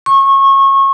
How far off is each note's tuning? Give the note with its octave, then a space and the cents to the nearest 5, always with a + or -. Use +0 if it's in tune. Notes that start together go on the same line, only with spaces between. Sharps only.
C#6 -25